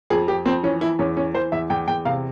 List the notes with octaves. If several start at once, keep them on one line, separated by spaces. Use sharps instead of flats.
F2 G#4
F2 G4
F2 C4
E3 C#4
E3 E4
E2 C#4
E3 C#4
E3 C5
E2 E5
E2 G5
E2 G5
C3 F5